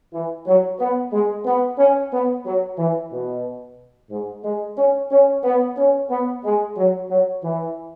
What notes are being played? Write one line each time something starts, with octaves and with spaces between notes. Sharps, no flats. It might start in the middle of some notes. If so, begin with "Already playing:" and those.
E3
F#3
B3
G#3
B3
C#4
B3
F#3
E3
B2
G#2
G#3
C#4
C#4
B3
C#4
B3
G#3
F#3
F#3
E3